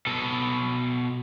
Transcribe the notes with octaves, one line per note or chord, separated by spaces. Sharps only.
B2 A4